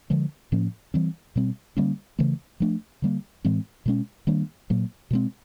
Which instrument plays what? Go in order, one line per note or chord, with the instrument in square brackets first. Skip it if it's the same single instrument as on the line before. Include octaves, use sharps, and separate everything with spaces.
[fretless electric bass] D3 F3 G#3
A2 F3 A#3 C#4
E3 G3 C4
B2 G3 C4
D3 G3 A#3 C#4
C#3 E3 A3
F3 A3 D4
D3 G3 A#3
A2 E3 G#3 C4
B2 G#3 C#4
D#3 G3 A#3 D4
A#2 F#3 A#3
B2 G#3 C4